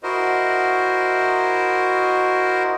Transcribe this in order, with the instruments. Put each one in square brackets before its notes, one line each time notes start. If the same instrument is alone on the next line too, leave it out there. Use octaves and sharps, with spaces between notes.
[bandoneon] E4 F#4 A#4 C5 D#5